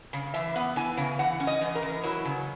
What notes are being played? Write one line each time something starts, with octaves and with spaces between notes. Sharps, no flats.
C#3
E3 E5
B3
E3 G#5
C#3
E3 F#5
C#4
D#5
E3
A#4
E3
F#3 E4
C#3